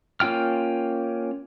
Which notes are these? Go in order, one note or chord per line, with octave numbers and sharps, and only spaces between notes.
A#3 C#4 F4 G5 F6